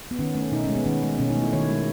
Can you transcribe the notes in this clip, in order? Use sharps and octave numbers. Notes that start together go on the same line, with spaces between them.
B3
D#3 C#4
A3 C#4
B2 D#4
G#3 C#4
B3
D#3 C#4
G#3
B2 C#4
D#4
A3
E4
D#3 C#5
G#3